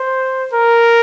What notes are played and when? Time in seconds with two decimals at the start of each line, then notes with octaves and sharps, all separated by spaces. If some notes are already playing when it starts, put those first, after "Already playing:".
Already playing: C5
0.53 A#4